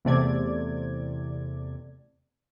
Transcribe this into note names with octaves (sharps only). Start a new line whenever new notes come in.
E2 C3 A3 D5 G#6